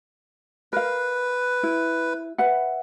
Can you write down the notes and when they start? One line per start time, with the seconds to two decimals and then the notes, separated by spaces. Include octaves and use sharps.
0.73 A#4 B4 F5
1.63 E4
2.38 B4 E5 F#5